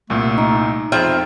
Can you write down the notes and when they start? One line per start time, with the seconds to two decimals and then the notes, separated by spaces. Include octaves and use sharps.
0.10 C2 A#2 A3
0.38 D#4
0.92 F2 C4 F4 G#4 E5 G5